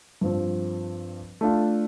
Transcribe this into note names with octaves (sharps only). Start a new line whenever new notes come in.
G2 F3 C4
A3 D4 F4